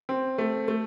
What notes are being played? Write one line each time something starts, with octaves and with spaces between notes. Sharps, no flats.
C4
A3
A3